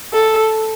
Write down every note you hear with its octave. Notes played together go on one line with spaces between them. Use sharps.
A4